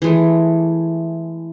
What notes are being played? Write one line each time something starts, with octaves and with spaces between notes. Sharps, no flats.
E3 G#3 A3